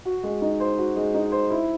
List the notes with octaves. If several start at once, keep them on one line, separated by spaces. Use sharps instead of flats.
F#4
G#3
D#4
C5
F#4
G#3
D#4
C5
E4